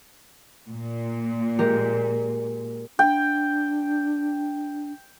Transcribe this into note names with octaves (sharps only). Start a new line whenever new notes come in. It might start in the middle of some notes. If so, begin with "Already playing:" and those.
A#2
G#3 G4 A#4
D4 G5